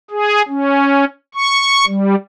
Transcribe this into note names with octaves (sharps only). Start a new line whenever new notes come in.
G#4
C#4
C#6
G3